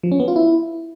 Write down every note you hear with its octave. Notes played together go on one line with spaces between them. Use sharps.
F3
C#4
B3
F4
E4